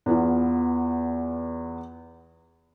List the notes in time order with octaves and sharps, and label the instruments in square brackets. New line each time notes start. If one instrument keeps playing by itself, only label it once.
[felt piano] E2 B3 F4